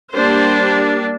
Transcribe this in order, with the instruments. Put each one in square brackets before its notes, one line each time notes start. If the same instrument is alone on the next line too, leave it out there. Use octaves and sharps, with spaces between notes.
[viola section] G3 A#3 D4 C5